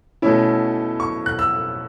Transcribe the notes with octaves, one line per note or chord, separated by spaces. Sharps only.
B2 A3 C#4 E4
C#6
F#6
E6